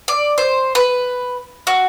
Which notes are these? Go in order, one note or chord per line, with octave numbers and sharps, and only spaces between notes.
D5
C5
B4
F#4